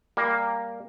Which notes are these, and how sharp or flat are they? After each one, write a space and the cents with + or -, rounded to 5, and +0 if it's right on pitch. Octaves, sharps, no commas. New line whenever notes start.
G3 +15 A#3 +0